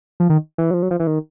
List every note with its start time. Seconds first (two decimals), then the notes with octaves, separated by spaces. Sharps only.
0.20 F3
0.30 D#3
0.58 E3
0.71 F#3
0.74 F3
0.83 F#3
0.91 F3
1.00 E3
1.07 D#3